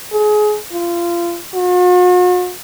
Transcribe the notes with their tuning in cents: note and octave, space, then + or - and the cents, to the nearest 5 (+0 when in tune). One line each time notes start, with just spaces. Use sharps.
G#4 +25
F4 -25
F#4 -45